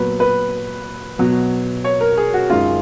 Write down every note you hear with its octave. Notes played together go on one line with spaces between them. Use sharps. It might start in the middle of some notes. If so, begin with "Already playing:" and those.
Already playing: A#2 F#3 B3 B4
B4
B2 F#3 B3
C#5
A#4
G#4
F#4
F#2 D#3 G#3 C#4 F4